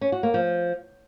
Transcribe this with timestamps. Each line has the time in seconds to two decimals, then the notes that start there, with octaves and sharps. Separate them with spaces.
0.01 C#4
0.12 F#4
0.23 A#3
0.34 F3